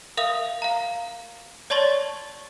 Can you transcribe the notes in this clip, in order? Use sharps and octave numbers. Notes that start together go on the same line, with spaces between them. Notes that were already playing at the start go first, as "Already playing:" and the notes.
A#4 E5 F5 D#6 F7
F5 A#5
C#5 D5 A5 C6 C#6 A6